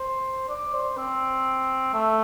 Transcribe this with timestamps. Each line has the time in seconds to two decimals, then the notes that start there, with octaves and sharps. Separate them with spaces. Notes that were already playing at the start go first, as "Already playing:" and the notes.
Already playing: C5
0.49 D5
0.74 C5
0.97 C4
1.94 A3